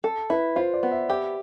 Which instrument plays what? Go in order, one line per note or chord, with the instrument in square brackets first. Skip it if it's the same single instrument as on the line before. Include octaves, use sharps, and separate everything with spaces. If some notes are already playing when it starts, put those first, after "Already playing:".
[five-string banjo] A4
[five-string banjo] E4 [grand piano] B4
[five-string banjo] F4 [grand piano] C5
[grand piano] D5
[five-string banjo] B3
[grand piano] E5
[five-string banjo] G4 [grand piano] E5